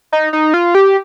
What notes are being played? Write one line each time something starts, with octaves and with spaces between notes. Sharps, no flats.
D#4
D#4
F4
G4